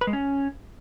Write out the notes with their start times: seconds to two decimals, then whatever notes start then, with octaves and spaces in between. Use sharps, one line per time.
0.01 B4
0.07 G#3
0.13 C#4